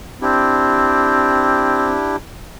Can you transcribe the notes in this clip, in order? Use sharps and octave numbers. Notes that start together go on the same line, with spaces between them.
C4 D4 E4 G4